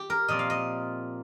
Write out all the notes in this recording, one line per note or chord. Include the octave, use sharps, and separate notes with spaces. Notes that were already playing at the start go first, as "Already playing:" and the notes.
Already playing: G4
A#4
A#2 F3 C4 D#5
F5
D#5